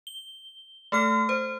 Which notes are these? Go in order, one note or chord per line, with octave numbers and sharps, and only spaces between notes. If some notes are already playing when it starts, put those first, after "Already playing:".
G7
A3 A4 F6
C5